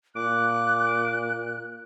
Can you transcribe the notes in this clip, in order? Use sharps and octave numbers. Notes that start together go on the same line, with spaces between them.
A#2 D6 F#6